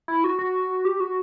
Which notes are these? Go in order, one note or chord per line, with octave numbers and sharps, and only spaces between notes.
E4
F#4
F#4
G4
F#4